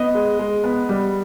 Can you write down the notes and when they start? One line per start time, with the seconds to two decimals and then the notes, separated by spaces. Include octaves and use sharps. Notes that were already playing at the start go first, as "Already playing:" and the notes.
Already playing: B3 D#5
0.15 G#3
0.39 G#3
0.64 B3
0.89 G3